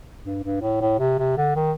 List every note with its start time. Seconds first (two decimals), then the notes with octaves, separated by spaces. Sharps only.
0.25 G2
0.44 G2
0.62 A2
0.81 A2
0.99 C3
1.18 C3
1.37 D3
1.55 D#3